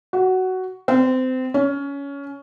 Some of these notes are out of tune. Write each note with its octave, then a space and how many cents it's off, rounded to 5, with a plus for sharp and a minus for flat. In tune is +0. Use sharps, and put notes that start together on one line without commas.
F#4 +10
C4 -25
C#4 +20